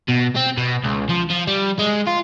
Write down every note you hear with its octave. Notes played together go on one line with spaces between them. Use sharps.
B2
C4
B2
C#2
F3
F3
G3
G#3
F4